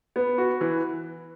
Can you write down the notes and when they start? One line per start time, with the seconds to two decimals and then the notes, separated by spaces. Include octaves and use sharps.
0.16 B3
0.38 F#4
0.61 E3